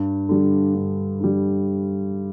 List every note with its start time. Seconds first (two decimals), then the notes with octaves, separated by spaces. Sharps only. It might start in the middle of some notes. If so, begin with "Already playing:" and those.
Already playing: G2
0.29 D3 G3
0.75 G2
1.20 D3 G3